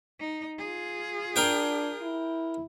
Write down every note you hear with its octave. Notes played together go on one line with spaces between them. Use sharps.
D#4
F4 G#4
D4 A#4 G5
E4